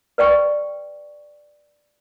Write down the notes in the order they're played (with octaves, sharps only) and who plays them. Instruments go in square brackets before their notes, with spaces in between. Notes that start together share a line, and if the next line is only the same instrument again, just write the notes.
[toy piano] B4 D5 G5 C#6